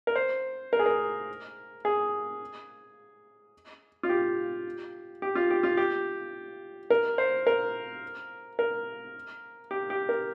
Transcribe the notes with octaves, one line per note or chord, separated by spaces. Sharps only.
A#4
C5
A#4
G#4
A#4
G#4
F4
G4
G4
F4
G4
F4
G4
A#4
C5
A#4
A#4
G4
G4
A#4